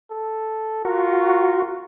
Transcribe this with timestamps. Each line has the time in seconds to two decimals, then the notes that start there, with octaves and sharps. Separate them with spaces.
0.11 A4
0.85 F4 F#4 A#4